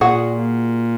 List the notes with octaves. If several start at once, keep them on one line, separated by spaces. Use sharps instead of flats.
A#2 F#4 G#4 F#5